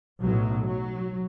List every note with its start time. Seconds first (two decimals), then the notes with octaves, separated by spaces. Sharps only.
0.22 B1 A2 F#3
0.68 F#3